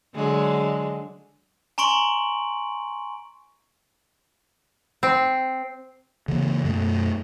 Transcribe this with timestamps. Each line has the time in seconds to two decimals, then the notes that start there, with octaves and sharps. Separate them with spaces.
0.15 D3 F#3 G#3
1.78 G#5 A#5 C6 C#6 D7 F#7
5.03 C4
6.28 C#3 E3 F#3 A#3
6.64 F#2 B2 A3